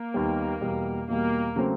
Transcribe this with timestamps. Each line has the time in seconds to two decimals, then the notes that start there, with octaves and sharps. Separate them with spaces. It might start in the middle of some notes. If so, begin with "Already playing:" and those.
Already playing: A#3
0.14 D#2 D#3 G3 B3
0.61 E2 B2 G3
1.08 E2 B2 G3 A#3
1.56 C#3 F#3 A3 C4